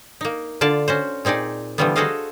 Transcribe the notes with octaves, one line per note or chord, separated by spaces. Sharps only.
A#3 D#4
D3 F4 D5 A5
C#4 F#4 C5
A#2 C4 D#4 G#4 D5
D3 E3 F3 G3 A3 B3
F#4 G#4 A4 C5 D#5 F5